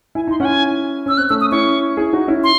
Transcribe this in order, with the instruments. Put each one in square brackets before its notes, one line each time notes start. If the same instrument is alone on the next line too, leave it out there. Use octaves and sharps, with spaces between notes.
[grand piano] E4 [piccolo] G#5
[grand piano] D#4 [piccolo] C6
[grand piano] C#4 E4 [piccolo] F#5
[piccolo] G#5
[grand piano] C#4 [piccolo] E6
[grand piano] C4 [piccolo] F#6
[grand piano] A3 C#4 [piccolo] E6
[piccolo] D#6
[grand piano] C#4 E4 [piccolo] C#6
[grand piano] E4 G#4
D#4 F#4
C#4 E4
[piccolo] C6